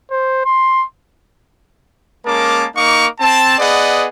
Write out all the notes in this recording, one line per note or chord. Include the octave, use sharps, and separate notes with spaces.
C5
C6
G#3 A#3 C#4 A#4 A5 D6
A#3 D#4 F5 C#6 D6
C4 A5
B3 G#4 B4 D5 D#5 F#5